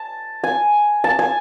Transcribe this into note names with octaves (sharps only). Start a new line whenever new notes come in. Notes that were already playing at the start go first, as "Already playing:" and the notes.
Already playing: A5
G#5
A5
G#5